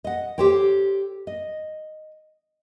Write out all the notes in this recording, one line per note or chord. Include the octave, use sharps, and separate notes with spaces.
D#5 F#5
G4 A4 C5 C#5 G5
D#5